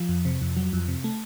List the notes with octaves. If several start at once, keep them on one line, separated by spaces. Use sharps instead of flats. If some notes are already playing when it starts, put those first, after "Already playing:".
Already playing: F3
F2
C3
F2
F#3
F2
C3
A3